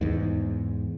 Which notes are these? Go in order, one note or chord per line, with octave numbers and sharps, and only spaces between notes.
E2 G#2